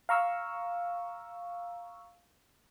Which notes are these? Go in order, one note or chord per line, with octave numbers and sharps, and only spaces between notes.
F5 A#5 C#6 E6